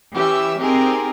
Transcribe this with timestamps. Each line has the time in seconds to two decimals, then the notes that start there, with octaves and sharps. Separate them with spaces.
0.14 E3 C#4 G4 E5 E6
0.61 C4 D#4 G4 G#4 A#4